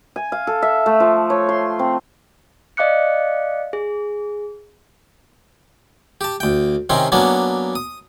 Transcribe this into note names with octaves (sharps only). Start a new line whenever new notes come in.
G#5
F5
A4
E5
A3
F3
C#5
C6
C4
D5 D#5 F5 D6 F#6 C#7
G#4
G4 A5
D2 G5
C3 D#3 C4 C#4
F#3 A#3 B3 C#4 D4
D#6